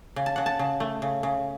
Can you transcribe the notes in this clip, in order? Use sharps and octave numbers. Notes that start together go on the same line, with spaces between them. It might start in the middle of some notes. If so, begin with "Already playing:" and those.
C#3
A5
C#3 F#5
A5
C#3
A3
C#3
C#3